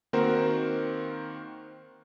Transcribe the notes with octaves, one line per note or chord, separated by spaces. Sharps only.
D#3 A#3 C4 F#4 A#4 C5